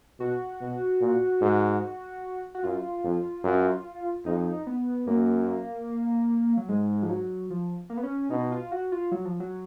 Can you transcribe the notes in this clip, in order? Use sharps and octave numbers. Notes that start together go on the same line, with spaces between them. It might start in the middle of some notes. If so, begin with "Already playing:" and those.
B2 F#4
B2
A#2
G#2
F#4
F#2 F4
F2
F#2
F2 D#4
B3
F#2 A#3
F#3
G#2 G#3
F3
F#3
F3
A#3
B3
C#4
B2 D#4
F4
F#4
F4
F#3
F3
F#3